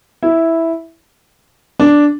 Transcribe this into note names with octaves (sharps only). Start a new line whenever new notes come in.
E4
D4